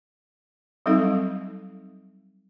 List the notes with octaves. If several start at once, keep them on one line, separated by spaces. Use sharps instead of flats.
F#3 G3 C4 D#4 A4 F5